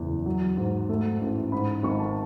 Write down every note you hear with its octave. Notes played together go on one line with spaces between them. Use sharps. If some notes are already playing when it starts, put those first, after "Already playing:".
Already playing: F#1 E2
F#3
G#2
A3
A1
G#2 B5
G#1 C#6
A5